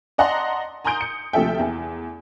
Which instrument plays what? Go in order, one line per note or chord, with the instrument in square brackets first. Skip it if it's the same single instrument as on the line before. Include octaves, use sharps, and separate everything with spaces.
[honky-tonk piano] D5 D#5 F#5 A5 A#5 C6
G#5 A#5 C6 D#6 G6 D7
C#7
D2 C3 F3 A4 E5 G5
E2